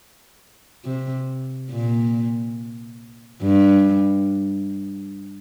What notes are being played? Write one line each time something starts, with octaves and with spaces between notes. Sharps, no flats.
C3
A#2
G2